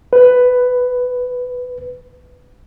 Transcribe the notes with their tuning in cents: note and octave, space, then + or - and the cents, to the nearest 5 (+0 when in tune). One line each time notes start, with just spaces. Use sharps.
B4 +10